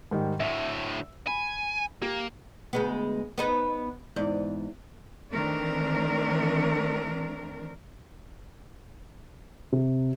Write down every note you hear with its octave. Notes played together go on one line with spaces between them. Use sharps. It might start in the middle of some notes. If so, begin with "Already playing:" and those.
G#2 D#3 G3
D2 A2 E5
G#5 B5
A#3 G4
D2 G#3 B3
B3 D#4 B4
E2 G#2 D5
D#3 E3 A3 C4 D4 A#4
C3